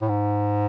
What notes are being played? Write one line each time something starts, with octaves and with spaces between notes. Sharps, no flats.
A2
G#2